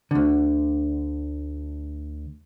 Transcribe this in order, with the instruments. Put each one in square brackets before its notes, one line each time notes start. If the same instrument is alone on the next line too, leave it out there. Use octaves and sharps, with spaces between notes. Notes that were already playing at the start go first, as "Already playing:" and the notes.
[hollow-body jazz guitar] D2 D3